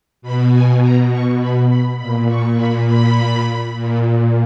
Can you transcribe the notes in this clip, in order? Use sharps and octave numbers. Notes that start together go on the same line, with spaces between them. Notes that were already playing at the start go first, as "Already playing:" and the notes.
B2 B5
G#5
A#5
C#6
B5
B5
A#2 B5
C#6
B5
B5
A#2